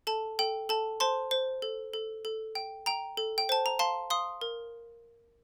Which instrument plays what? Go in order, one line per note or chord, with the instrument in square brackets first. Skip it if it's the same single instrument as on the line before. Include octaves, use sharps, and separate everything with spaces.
[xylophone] A4 A5
A4 G5
A4 A5
C5 A5 C6
C5
A4
A4
A4
G5
G5 A#5
A4
G5
C5 A5
A#5
F5 A5 C6
F5 C6 D#6
A#4